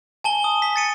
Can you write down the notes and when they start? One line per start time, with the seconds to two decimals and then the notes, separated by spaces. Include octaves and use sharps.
0.24 G#5 A5 G7
0.44 D#6
0.62 B6
0.76 A6 C#7 D#7